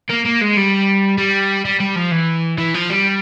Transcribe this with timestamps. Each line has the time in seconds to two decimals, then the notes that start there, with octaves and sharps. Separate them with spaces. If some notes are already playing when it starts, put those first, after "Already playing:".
0.09 A#3
0.25 A#3
0.41 G#3
0.56 G3
1.18 G3
1.65 G3
1.80 G3
1.96 F3
2.11 E3
2.58 E3
2.74 F3
2.89 G3